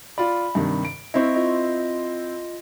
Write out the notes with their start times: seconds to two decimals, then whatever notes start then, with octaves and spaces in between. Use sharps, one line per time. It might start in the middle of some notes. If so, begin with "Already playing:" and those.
0.18 F4 D5 B5
0.55 G2 C3 D#3
0.85 D7
1.14 C4 E4 D#5 C#6
1.35 F4 D#5